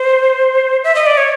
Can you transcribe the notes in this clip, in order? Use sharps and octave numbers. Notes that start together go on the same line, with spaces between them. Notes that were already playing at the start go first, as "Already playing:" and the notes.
Already playing: C5
E5
D#5
D5
C#5